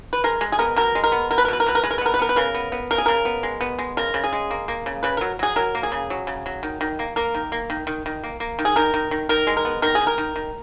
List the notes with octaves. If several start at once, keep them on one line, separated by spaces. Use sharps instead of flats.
B4
G#3 A#4
G#3
G#4
B3 A#4
B2 A#4
G#3
A#4
B3
B2 A#4
B4
A#4
B2 B4
A#4
B2 B4
A#4
G#3 B4
A#4
B4
B3 A#4
B4
B3 A#4
B4
C#3 A#4
B3
B3
C#3 A#4
G#4
C#3 A#4
B3
G#3
B3
G#3
C#3 A#4
C#3
G#4
G#3
A#3
A#3
C#3
C#3 B4
F#3 A#4
F#3 G#4
F#3 A#4
A#3
G#4
C#3
F#3
C#3
F#3
D#3
D#3
A#3
A#3 A#4
D#3
A#3
D#3
D#3
D#3
A#3
A#3
D#3
G#4
D#3 A#4
D#3
D#3
D#3 A#4
G#3
A#4
B3
D#3 A#4
G#4
D#3
A#4
D#3
D#3